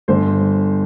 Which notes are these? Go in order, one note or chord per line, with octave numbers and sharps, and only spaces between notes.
G1 C5